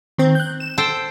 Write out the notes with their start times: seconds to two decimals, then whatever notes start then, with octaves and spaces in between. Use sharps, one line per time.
0.18 D#3 C4
0.35 F#6 G6
0.60 E7
0.78 A4 C5 G5